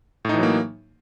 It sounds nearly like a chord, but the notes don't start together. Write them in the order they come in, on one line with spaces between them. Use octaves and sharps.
A2 D#4 E3 F#3 A#3